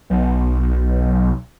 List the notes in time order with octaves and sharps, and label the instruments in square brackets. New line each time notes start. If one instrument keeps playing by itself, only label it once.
[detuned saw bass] B1